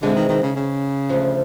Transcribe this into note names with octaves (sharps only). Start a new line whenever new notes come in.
E2 B2 D3 G#3 C4 E4
D#3
D#3
C#3
C#3
D2 D3 F3